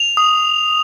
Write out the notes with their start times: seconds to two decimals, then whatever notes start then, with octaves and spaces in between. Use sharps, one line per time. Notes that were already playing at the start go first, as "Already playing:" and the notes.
Already playing: F7
0.17 D#6